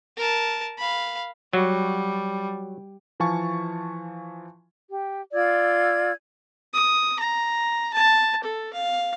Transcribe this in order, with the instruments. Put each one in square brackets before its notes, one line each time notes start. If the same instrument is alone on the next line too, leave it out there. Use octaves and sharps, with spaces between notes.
[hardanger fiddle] A#4 A5
F5 B5
[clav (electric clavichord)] F#3 F#4 [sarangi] G3
[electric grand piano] E3 F3 F5 G#5 A5 C#6
[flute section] G4
F4 D5 E6 G#6
[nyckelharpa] D#6
A#5
A5
A4
F5